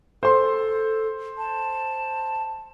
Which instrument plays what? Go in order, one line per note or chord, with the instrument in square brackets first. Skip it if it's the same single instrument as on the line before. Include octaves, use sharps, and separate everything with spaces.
[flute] A4 [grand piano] C5 C6
[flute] A5